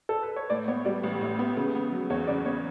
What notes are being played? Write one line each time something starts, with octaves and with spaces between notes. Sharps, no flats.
A4
B4
C#5
A2 D5
B3 C#5
G3 D5
A1
A2
B3
C#3
B3
F#3
E2 C#5
C#3 D5
B3 C#5